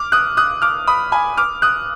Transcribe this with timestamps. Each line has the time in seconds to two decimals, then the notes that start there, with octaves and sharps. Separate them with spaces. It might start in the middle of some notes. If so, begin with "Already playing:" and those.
Already playing: D6 F6
0.12 D#6 F#6
0.37 D#6 F#6
0.62 D6 F6
0.87 B5 D#6
1.12 G#5 B5
1.37 D6 F6
1.62 D#6 F#6